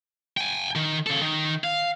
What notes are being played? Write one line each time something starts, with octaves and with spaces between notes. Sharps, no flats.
G5 G#5
D#3
C#3 A4
D#3
F5